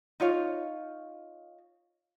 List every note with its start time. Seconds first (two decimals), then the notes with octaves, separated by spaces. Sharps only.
0.20 D#4 F4 C#5 F5